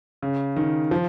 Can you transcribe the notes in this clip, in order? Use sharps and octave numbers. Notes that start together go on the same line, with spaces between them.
C#3
D#3
F3